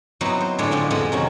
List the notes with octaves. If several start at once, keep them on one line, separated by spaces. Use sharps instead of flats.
F#3 B3 C4 D#4 E4
C5
A2 D3 G#3 D4 C#5
A2 D3 C4 F4
F2 B2 G#3 G#4 F#5 C6
C3 D#3 F#3 C#4